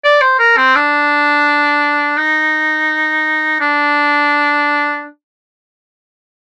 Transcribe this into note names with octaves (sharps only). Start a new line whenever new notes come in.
D5
C5
A#4
C4
D4
D#4
D4